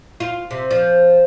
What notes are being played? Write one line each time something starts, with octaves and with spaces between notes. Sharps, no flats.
F4
C3
F3